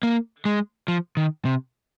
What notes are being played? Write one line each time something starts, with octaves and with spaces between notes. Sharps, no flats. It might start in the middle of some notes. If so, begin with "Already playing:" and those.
A#3
G#3
F3
D#3
C3